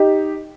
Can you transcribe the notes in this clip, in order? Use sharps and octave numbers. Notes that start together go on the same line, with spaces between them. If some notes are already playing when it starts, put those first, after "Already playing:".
Already playing: D#4 G4